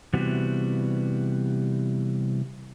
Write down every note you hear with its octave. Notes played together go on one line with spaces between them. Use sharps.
C3 E3 G3 B3 F#4